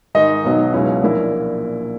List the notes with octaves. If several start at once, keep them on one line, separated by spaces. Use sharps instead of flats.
G#2 D#3 G#3 D#4 D#5
B1 B2 F#3 B3 D#4
C#2 B2 F#3 C#4 E4
A#1 A#2 A#3 E4